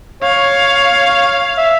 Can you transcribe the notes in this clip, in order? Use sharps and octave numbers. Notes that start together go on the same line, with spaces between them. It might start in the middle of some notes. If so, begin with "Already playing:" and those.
C#5 F5
E5